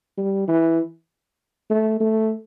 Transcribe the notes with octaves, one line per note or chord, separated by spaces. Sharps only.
G3
E3
A3
A3